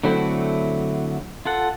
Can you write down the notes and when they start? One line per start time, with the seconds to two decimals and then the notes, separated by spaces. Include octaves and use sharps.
0.03 D3 F#3 A3 C4 E4
1.45 F4 A4 F#5